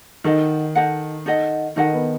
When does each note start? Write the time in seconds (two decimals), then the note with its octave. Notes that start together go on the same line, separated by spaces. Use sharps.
0.24 D#3 D#4 A4 D#5 F#5
0.75 D#4 A4 D#5 F#5
1.26 D#4 A4 D#5 F#5
1.76 D#3 D#4 A4 D#5 F#5
1.94 B3